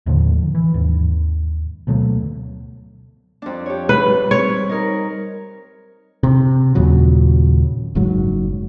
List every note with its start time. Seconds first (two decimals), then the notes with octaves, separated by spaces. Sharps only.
0.06 D#2 A2 D3 F3
0.55 E3
0.74 D#2 G#2
1.87 D2 B2 F#3 A3
3.42 F2 D4
3.66 G4 C#5
3.89 B4
4.05 G3
4.31 C4 C#5
4.69 D#4 A#4
6.23 C3
6.75 D#2 A#2 C#3 F#3
7.95 F#1 G#2 F#3